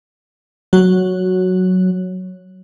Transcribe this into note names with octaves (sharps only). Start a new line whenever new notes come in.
F#3 F#4 C#5